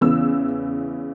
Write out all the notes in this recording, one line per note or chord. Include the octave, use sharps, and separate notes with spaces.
E2 C#3 E3 E6